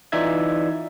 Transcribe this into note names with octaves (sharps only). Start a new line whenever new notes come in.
E3 D#4 F4 D5 E5 G#6